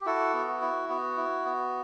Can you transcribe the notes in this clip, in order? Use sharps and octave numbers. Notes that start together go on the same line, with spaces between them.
G4
E4 F#4 A4
B3
F#4
E4
B3 F#4
E4
B3